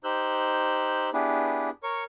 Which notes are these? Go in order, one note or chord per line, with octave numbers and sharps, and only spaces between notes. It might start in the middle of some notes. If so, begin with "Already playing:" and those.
D#4 G4 C5 E6 F#6 G6
B3 D4 E4 G4 G#4 B4
A#4 C#5 C#6